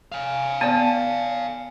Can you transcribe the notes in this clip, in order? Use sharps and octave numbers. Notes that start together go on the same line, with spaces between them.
F5 G#5
B3 D5 A5